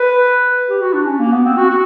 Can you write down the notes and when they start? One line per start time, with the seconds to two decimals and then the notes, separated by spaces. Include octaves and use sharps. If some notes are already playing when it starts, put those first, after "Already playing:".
Already playing: B4
0.69 G4
0.81 F#4
0.93 D4
1.06 C#4
1.19 A#3
1.32 B3
1.45 C4
1.57 F#4
1.71 F#4